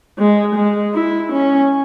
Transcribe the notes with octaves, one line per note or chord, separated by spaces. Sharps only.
G#3
G#3
E4
C#4